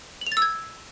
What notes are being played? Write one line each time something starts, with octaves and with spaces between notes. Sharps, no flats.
F#7
F7
A6
E6
G#6